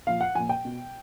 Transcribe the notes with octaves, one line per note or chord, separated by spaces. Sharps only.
A#2 F3 F5
F#5
A#2 F3 G#5
G5
B2